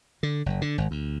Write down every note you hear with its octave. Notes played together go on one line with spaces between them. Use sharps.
D3
F#1
D3
G#1
D2